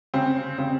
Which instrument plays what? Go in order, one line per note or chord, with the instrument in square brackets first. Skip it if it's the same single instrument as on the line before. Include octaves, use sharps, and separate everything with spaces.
[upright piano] C#3 C4
C#3 C4